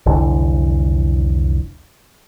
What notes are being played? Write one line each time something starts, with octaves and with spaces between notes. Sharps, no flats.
F1 C2 D3 E3